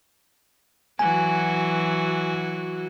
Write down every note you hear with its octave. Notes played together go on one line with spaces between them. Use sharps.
E3 F#3 F#4 G#5